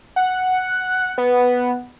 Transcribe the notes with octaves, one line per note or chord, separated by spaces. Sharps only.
F#5
B3